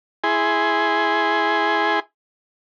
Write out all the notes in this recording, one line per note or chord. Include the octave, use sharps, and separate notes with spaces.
E4 G#4 G#5 C6